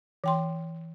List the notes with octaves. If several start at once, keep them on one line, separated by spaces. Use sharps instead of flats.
E3 G5 C6